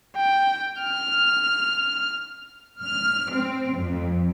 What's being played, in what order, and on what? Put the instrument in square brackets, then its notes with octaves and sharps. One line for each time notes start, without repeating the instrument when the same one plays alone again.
[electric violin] G5
F6
[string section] F6
C4
F2